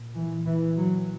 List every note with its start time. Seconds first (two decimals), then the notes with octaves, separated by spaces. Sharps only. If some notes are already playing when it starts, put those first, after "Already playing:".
Already playing: A#2
0.16 E3
0.46 E3
0.76 F#3